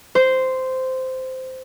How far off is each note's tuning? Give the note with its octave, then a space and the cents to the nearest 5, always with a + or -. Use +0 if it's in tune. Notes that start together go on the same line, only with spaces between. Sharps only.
C5 -10